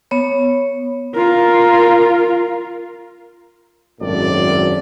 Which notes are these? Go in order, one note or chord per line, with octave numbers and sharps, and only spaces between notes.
B3 C#5
F4 A#4
G#1 F#2 A2 D5